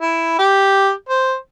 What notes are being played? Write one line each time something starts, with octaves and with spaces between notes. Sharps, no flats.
E4
G4
C5